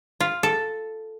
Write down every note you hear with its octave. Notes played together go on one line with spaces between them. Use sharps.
F4
A4